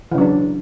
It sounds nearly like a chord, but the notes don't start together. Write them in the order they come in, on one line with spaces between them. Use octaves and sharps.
E3 C#3 F#3 D4